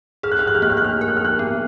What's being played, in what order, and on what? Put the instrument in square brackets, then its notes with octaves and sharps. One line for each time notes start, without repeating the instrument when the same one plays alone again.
[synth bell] G#4 [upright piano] F6
[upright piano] F#6
F6
F#6
F6
[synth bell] A#3 [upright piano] F#6
[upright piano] F6
F#6
F6
[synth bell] A#4
[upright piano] F#6
F6
F#6
[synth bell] B3